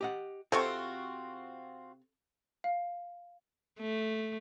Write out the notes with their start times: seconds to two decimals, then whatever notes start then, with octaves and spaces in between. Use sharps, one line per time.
0.01 G4 D#5 F#5
0.52 C3 C4 F4 F#4 A4 G5 C#6
2.64 F5
3.80 A3